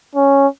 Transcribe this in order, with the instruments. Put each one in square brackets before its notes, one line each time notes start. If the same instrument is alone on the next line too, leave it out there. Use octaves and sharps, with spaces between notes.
[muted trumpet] C#4